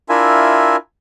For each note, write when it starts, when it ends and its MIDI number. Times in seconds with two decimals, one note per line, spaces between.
0.09 0.76 62
0.09 0.76 64
0.09 0.76 65
0.09 0.76 70
0.09 0.76 76
0.09 0.76 80